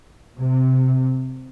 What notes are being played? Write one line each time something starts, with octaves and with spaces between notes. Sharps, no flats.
C3